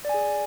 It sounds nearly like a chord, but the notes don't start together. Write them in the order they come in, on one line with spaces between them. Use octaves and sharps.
D5 G#5 G#4